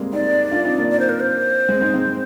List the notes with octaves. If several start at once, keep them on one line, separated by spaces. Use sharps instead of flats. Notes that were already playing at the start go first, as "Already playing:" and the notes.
Already playing: G3 G#3 A#3 C4
C4 D#4 D5
D4 F4
C4 D#4
A#3 D4
D5
C5
A#4
C5
G#3 C4
C4 D#4
G#3 C4